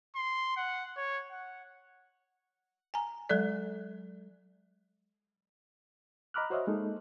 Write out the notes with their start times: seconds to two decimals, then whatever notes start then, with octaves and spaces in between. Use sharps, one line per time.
0.16 C6
0.57 F#5
0.97 C#5
1.31 F#5
2.94 G#5 A#5
3.29 F#3 G#3 A4 D5
6.34 D#5 A#5 B5 D6 F6 F#6
6.50 F#4 C5 C#5 D#5 E5
6.67 G#3 A#3 D#4 A4